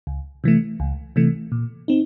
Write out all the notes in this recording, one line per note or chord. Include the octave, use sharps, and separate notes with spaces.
C#2
C3 E3 A3
C#2
C3 E3 A3
A#2
C4 D#4